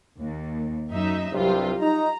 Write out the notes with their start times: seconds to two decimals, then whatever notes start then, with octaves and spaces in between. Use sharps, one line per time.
0.20 D#2
0.90 F#2 D#4 E5
1.33 C2 G2 C3 F#3 G3 F4
1.80 D#4 A#5